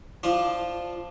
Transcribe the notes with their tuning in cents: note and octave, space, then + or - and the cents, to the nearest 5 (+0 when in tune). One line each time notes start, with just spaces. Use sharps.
F3 +0 D4 +0 F4 +0